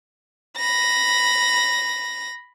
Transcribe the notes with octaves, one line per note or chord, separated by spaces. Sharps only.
B5 A#6